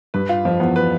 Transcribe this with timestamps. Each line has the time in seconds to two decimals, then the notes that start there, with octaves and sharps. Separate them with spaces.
0.14 G2 B4
0.29 F4
0.45 F2 F3
0.60 E2 B3
0.76 B4